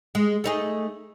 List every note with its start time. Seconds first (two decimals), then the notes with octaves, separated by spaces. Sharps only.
0.15 G#3
0.44 A3 D#4 G#4